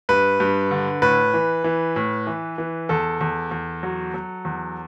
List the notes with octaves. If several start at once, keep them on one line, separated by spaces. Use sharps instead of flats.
G2 B4
G2
D3
A2 B4
E3
E3
A2
E3
E3
E2 A4
E2
E2
F#3
F#3
E2